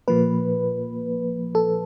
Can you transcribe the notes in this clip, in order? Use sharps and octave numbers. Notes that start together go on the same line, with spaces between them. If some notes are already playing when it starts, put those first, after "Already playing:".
A#2 F3 A#3 B4
A4